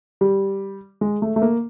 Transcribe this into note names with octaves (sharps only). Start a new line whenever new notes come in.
G3
G#3
A3
A3
A#3